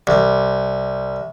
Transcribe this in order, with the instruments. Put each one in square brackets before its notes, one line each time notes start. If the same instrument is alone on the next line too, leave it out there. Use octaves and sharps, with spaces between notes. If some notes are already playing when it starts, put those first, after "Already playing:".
[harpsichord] C2